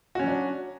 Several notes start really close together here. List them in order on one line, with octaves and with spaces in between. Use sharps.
F#4 C#4 F#3 D4